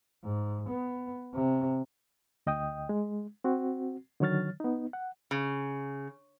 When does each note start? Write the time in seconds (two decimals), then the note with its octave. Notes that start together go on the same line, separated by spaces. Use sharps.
0.24 G#2
0.69 B3
1.34 C3
2.47 D2 D#5 G5 D#6
2.89 G#3
3.44 C4 F#4
4.20 D3 D#3 F#3 C#5 F6 A6
4.60 B3 D#4
4.93 F#5
5.31 C#3